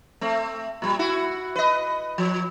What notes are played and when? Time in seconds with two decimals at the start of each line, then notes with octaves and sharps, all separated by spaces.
0.21 A3 C4
0.82 A#2 G3
0.99 E4 F#4
1.56 B4 D#5
2.18 F3